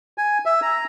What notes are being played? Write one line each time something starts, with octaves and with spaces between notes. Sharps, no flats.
G#5
E5
A#5